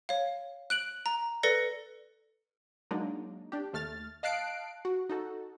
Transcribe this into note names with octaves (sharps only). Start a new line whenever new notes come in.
C#5 F5
F#6 D7 F#7
A#5
A4 B4 D5 A#6 C#7
F#3 G#3 A#3 D4 D#4
D4 G4
D#2 A3 F6 A6
D#5 F5 A5 F#6 C7 D7
F#4
D#4 F#4 A4